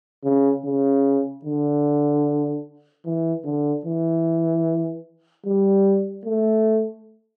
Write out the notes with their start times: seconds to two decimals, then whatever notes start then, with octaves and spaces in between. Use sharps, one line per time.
0.24 C#3
0.65 C#3
1.45 D3
3.06 E3
3.45 D3
3.85 E3
5.46 G3
6.25 A3